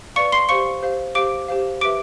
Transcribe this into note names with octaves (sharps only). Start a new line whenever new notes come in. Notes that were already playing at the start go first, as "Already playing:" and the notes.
B4 D5 F5 C#6 C#7
C6 C7
G4 C5 F5 C#6 C#7
G4 C5 F5
G4 C5 F5 D6 D7
G4 C5 F5
G4 B4 E5 D6 D7